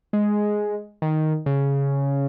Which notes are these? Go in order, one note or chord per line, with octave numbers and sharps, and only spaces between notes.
G#3
D#3
C#3